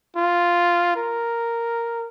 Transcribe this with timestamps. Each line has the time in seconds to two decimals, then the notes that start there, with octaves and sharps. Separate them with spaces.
0.16 F4
0.96 A#4